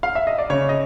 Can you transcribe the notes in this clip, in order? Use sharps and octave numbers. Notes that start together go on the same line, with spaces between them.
F5
E5
D#5
D5
C#3 C#5
D#5